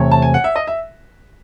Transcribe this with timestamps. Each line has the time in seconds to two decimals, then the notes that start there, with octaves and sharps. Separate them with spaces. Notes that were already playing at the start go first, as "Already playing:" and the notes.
Already playing: E2 C3 E3 A3 C#5
0.11 A5
0.22 G#5
0.34 F#5
0.44 E5
0.56 D#5
0.67 E5